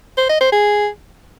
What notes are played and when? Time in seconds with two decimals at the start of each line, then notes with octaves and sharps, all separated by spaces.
0.18 C5
0.29 D#5
0.41 C5
0.52 G#4